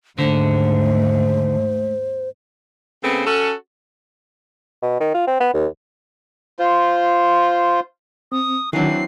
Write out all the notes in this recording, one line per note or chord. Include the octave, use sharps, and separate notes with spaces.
D#2 G#2 D3 A3 C5
C#3 A3 B3 C4
C#4 F#4 A4
B2
D#3
F4
C4
B3
D#2
F4 C5
C4 D#6
D#3 E3 F#3 C4 D4 F#4 C7